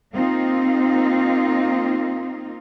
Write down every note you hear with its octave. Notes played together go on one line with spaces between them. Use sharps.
A#3 C4 D#4 F4